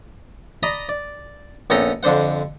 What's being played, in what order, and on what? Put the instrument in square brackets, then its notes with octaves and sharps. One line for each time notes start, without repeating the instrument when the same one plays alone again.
[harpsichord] D5 D#5 A#5 B5
D5
A#1 B3 C#4 A4 G5 A#5
F2 D3 D4 C5 F#5